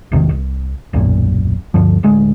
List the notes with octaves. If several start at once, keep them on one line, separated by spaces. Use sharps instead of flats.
G#1 E2 C3 D#3
C2
D#1 B1 F#2 A#2
D2 G2 F3
D1 D2 G#3